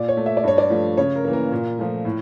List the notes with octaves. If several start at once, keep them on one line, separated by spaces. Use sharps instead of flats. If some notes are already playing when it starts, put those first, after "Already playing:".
Already playing: A#2 D5
C#5
A3
E5
D5
G2 C#5
D5
F3 A3
C#3 C#5
A#4
E3 A#3
A#4
A#2
F3 A3
A2